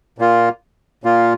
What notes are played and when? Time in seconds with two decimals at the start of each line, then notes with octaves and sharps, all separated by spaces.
0.18 A#2 A#3 F4
1.04 A#2 A#3 F4